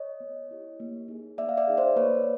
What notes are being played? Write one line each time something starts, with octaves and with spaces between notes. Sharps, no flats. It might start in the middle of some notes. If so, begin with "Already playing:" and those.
Already playing: C#5 D#5
B3
E4 G4
A#3
D#4 G#4
A#3 D5 E5
F5
D5 E5
D#4 G#4
C5 D5
A#3 B4 C#5